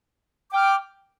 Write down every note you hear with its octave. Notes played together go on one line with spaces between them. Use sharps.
G5 D6 F6